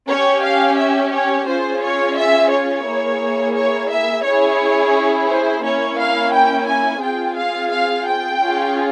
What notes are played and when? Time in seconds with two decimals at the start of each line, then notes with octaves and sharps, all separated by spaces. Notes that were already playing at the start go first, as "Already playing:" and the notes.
0.08 C#4 G4 C#5
0.43 F5
0.78 E5
1.13 C#5
1.47 C#4 F4 G#4 C5
1.82 C#5
2.17 E5
2.51 C#5
2.86 A#3 E4 G#4
3.55 C#5
3.89 E5
4.24 C#4 E4 G#4 C#5
5.28 C5
5.63 A#3 C#4 E4 C#5
5.98 F5
6.32 G5
6.66 G#5
7.01 C4 F4 G#4 G5
7.36 F5
7.70 F5
8.06 G5
8.40 C#4 F4 G#4